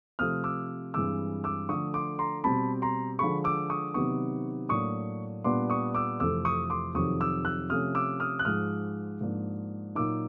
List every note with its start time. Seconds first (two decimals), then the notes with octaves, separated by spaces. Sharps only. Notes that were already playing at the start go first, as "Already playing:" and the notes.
0.19 C3 F3 A3 C4 D#6 F6
0.44 D6 E6
0.94 G2 E3 G#3 C4 D6 E6
1.44 D6 E6
1.69 D3 F3 A3 C#6 D#6
1.94 C6 D6
2.19 A#5 C6
2.44 B2 G3 C4 A5 B5
2.82 A#5 C6
3.19 D3 F3 G#3 B5 C#6
3.44 D6 E6
3.70 C#6 D#6
3.94 C3 D#3 F#3 B3 D#4 C#6 D#6
4.69 A2 F#3 A#3 D4 C#6 D#6
5.44 A#2 G3 B3 D4 C6 D6
5.70 C#6 D#6
5.94 D6 E6
6.20 F2 C3 E3 A3 C4 D6 E6
6.45 C#6 D#6
6.70 C6 D6
6.95 F2 C3 D#3 F#3 C#6 D#6
7.20 D6 E6
7.45 E6 F#6
7.70 C3 F3 A3 C#4 D#6 F6
7.95 D6 E6
8.20 D#6 F6
8.39 F#6
8.45 G#2 F3 G#3 D#6 F6
9.21 G#2 F3 A#3 D4
9.95 A#2 F#3 A#3 D#4 D6 E6